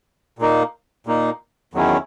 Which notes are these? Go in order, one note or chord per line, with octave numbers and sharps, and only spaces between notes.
A#2 A#3 D#4
A#2 A#3 D#4
E2 D#3 F#3 C#4 E4